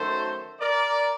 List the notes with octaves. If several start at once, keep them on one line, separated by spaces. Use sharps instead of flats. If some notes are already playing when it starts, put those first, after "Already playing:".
Already playing: F#2 D#3 F#3 A3 A4 C5
A#4 D5